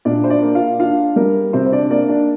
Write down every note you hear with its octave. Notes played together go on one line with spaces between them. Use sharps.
A#2 D4 D5
C5
D4 D5
A#3
F4 F5
D4 F4 F5
G3 A#4
C3 C4 C5
C5
D4 D5
A#3 D4 D5
D4 D5